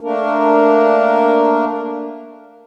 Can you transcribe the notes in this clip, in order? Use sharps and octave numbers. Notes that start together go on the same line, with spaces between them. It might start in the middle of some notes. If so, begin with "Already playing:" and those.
A3 A#3 D4 A#4